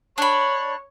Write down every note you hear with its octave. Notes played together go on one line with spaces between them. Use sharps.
D4 C#5 B5